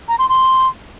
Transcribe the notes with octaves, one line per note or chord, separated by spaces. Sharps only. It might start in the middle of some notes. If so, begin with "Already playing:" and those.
A#5
C6
C6